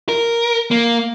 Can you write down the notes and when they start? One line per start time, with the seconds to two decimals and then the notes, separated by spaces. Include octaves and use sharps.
0.09 A#4
0.71 A#3